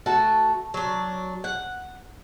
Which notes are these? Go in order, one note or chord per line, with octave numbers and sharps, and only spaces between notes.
A3 F#4 A5
F#3 D4
F#5